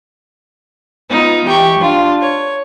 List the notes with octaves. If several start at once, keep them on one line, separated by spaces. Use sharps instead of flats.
B3 D#4 F4
E3 G4 G5 C#6
D4 F4
C#5